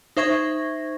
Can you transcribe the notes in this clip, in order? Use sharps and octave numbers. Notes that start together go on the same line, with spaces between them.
D#4 C5 E5 C#6 G#6 A#6